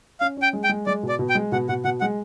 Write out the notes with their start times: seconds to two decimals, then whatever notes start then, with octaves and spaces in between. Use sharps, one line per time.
0.20 C#4 F5
0.37 C#4
0.42 G5
0.53 G#3
0.64 G5
0.69 G#3
0.86 G#3 D5
1.03 B2
1.09 D5
1.19 B2
1.29 G5
1.35 G#3
1.52 B2 F#5
1.69 B2 F#5
1.84 B2 F#5
2.01 G#3 F#5